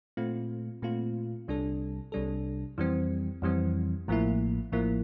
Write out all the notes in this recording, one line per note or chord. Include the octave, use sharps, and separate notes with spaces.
A#2 A3 C4 F4
A#2 A3 C4 F4
C2 C3 G3 D4 A4
C2 C3 G3 D4 A4
F2 E3 G3 C4
F2 E3 G3 C4
A1 A2 F3 A#3 E4
A1 A2 F3 A#3 E4